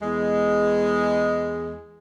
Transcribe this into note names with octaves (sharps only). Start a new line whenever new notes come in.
E2 G#3